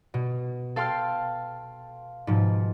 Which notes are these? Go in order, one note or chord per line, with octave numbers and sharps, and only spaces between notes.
B2
A4 F5 G5 C6 F6
G#2 B2 F3